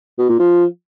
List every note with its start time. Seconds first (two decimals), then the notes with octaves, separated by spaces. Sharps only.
0.18 B2
0.29 A#2
0.39 F3